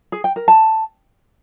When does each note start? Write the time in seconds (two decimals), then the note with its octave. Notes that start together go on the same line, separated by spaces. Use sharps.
0.12 G#4
0.24 G5
0.36 A#4
0.48 A5